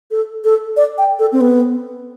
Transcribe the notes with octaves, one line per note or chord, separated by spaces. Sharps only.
A4
A4
D5
G5
A4
C4
B3